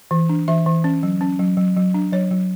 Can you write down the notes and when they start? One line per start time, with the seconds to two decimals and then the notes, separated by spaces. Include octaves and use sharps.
0.11 E3
0.29 D4
0.48 E3 E5
0.66 E3
0.84 C#4
1.03 F#3
1.21 C#4
1.39 F#3
1.57 F#3
1.76 F#3
1.94 D4
2.12 F#3 C#5
2.31 F#3